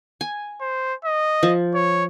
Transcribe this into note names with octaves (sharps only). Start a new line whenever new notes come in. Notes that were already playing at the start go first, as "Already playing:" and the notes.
G#5
C5
D#5
F3
C#5